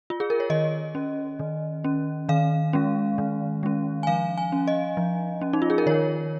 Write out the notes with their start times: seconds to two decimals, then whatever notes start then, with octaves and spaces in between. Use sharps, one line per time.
0.10 F4
0.20 G#4
0.30 A#4
0.40 C#5
0.50 D#3 D#5
0.95 C#4
1.39 D#3
1.84 C#4
2.29 D#3 F5
2.73 G#3 C#4
3.18 D#3
3.63 G#3 C#4
4.03 G#5
4.07 F3 F5
4.38 G#5
4.52 C#4
4.68 D#5
4.97 F3
5.41 C#4
5.53 D#4
5.62 F4
5.70 G#4
5.78 A#4
5.86 D#3 C#5